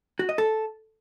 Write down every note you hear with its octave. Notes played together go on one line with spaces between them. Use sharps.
F#4
D#5
A4